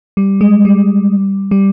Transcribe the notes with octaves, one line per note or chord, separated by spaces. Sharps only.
G3
G#3
G3
G3